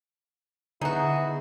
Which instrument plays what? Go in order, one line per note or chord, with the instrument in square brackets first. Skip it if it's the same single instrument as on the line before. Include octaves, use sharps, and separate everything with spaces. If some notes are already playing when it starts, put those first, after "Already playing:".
[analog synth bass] D3 [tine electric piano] B3 G#4 [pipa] D#4 F#4 [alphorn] E4